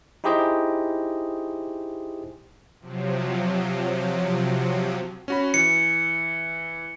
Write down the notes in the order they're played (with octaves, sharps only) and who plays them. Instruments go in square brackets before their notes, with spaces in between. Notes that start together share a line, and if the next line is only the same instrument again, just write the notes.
[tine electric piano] D#4 E4 G4 G#4 C5 D#5
[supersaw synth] C3 F3 F#3
[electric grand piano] C#4 F#4 B5
[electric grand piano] E3 [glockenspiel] C#7